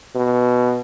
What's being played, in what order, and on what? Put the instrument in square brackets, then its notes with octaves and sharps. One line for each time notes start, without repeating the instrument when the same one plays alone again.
[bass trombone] B2